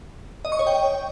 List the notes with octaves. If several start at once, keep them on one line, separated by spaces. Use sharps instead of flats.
D#5
C#6
C#5
G5